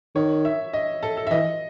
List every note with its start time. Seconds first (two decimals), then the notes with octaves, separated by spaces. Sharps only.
0.16 D#3 C#5
0.45 E5
0.74 D#5
1.03 A4
1.17 A4
1.27 E5
1.31 E3 D#5